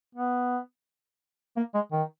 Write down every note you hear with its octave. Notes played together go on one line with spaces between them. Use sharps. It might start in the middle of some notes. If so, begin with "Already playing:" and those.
B3
A#3
G#3
D#3